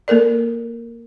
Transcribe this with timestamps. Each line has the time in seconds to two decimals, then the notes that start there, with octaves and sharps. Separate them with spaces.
0.08 A#3 A4 A#4 D5